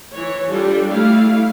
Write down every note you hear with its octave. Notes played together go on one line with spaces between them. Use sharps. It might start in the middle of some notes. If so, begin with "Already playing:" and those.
E3 C#5
G3 D4 F4 A4
G3 A3 E4 F5